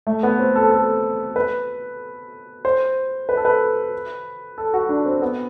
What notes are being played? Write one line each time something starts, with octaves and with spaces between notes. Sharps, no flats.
A3
B3
C4
A4
A4
B4
C5
B4
A4
B4
A4
F#4
D4
C4
B3